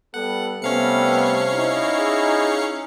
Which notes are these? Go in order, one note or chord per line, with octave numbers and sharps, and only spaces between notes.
G3 B3 A4 F#5
C3 G3 A3 B3 C#4 F5 C#7
D#4 E4
G#4